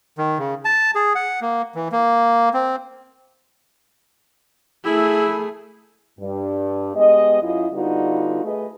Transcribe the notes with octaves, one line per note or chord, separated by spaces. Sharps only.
D#3
C#3
A5
G#4
F#5
A#3
E3
A#3
C4
A3 E4 G#4
G2
G#3 B3 G4 D#5
F#2 E4 F4 D#5
D3 G3 B3 D#4 F4 F#4
A3 G#4 B4 D#5